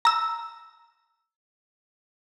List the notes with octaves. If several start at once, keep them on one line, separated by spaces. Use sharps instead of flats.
A#5 E6